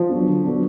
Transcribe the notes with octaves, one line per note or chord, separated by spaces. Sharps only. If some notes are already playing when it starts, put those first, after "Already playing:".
Already playing: F3
F#3 B3 D4
D3
F#3 B3 D4